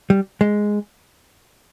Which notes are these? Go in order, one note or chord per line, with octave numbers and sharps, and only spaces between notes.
G3
G#3